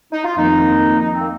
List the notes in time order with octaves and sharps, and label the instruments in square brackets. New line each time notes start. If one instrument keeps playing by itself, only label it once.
[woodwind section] D#4
F4
[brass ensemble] F2 D#3 A#3 [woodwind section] D#4
[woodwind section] D#4
C4
A#3